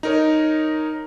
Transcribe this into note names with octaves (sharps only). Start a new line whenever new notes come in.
D#4 A#4 C#5